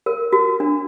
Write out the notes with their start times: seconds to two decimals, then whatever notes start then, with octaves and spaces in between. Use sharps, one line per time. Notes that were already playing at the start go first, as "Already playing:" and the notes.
0.06 A#4
0.33 F#4
0.60 D4